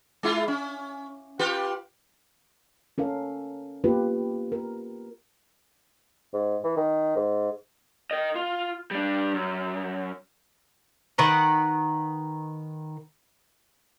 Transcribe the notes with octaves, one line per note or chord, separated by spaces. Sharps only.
G#3 E4 F4
C#4
F4 G4 B4
C#4 A4 A#4 F5
A#3 B3 F4 G4 B4
A#4
G#2
E3
D#3
G#2
A#4 D#5
F4
G3 D4
F#2
D#3 B4 F#5 A#5